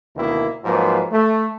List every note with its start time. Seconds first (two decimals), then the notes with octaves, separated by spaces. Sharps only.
0.16 D2 B2 D#3 A#3 E4
0.64 G#2 F3 F#3 A#3 B4
1.12 A3